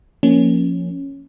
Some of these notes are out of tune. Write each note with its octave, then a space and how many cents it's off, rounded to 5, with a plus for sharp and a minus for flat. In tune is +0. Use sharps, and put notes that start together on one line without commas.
F3 +0 A#3 +0 C#4 +0